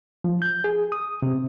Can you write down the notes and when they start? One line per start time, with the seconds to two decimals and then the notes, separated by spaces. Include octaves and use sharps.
0.24 F3
0.42 G6
0.64 G#4
0.92 D#6
1.22 C3